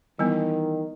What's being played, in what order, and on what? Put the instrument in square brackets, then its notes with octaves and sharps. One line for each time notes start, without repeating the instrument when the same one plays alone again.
[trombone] D#3 [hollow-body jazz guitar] E3 [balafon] G3 B3